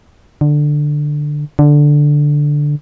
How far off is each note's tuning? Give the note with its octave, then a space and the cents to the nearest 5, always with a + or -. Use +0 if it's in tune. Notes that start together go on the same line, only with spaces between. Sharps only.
D3 +10
D3 +0